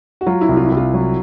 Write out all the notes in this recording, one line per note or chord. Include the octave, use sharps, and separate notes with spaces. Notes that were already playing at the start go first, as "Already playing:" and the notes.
F#4
F#3 F4
E4
C2
F4
E4
C2
F4
F#3